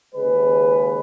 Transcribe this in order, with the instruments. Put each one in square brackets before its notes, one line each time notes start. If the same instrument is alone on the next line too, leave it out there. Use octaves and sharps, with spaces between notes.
[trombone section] D#2 C#3 G#3 B4